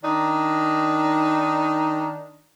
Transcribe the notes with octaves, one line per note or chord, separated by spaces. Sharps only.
D#3 D4 D#4